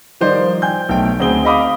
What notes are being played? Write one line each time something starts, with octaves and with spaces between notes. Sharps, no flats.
D#3 F3 G3 C5 D5 D#5
G5 G#5 G6
B1 A3 G5
D2 C4 G#4 G7
D#5 F5 B5 D6 D#6